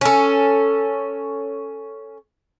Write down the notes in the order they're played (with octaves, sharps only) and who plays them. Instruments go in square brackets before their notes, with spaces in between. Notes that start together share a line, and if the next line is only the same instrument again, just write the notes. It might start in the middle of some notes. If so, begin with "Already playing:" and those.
[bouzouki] C#4 A4